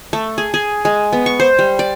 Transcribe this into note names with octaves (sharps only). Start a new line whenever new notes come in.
A3
G#4
G#4
G#3
B3
C#6
C5
G3
D5